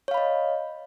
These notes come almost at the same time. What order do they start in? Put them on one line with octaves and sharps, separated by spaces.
C#5 F5 B5 D#5